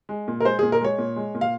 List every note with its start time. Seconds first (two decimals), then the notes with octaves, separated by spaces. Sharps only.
0.09 G#3
0.28 A#2
0.40 A#4
0.44 G#3 C5
0.59 A#2 G#4
0.72 A#4
0.81 G#3 C#5
0.98 A#2
1.16 G#3
1.35 A#2
1.41 F5